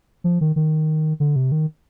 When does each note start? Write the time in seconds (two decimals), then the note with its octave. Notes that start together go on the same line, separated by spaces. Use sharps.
0.24 F3
0.41 D#3
0.56 D#3
1.20 D3
1.36 C3
1.52 D#3